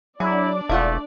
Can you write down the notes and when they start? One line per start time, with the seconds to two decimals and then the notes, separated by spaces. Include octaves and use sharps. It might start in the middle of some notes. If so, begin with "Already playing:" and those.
0.20 F#3 D4 E4 G#4 D5
0.69 E1 A3 E4 F4 F#5